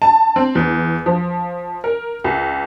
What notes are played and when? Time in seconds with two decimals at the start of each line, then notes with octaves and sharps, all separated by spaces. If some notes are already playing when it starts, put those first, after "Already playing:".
0.02 A5
0.36 C4
0.55 E2
1.06 F3
1.84 A#4
2.24 C#2